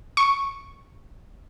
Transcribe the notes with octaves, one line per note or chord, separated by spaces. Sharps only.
C#6